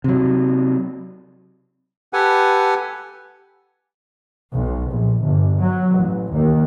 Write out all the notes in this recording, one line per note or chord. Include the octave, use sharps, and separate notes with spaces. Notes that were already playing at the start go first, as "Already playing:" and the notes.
C3 F#3
G4 A4 B4 F#5 G#5
B1
A#1
G1
F#3
A1
D#2